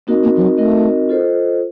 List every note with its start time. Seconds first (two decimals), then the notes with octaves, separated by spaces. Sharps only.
0.07 A#3 C4 D#4 F#4 A#4 D#5
0.23 A#3
0.37 F3
0.41 F#3
0.58 A3 C4 D#4 F#4 A#4 D#5
1.09 F4 A4 C5 D#5